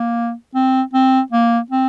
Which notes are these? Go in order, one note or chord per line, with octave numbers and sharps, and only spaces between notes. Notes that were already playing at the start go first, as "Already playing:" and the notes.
Already playing: A#3
C4
C4
A#3
C4